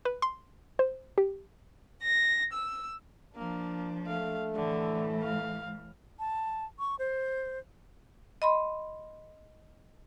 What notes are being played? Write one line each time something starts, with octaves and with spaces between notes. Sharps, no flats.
B4
C6
C5
G4
A#6
E6
F3 A#3 D4
A3 F5
A2 D3 E3
F5
A5
C#6
C5
D#5 B5 C6